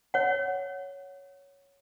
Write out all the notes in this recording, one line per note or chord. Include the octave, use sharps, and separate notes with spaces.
C#5 F#5